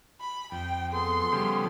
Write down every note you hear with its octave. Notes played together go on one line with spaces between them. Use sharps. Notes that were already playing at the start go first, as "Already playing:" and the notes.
B5
F2 G5
B3 G#4 A4 C6
C#3 F3 G3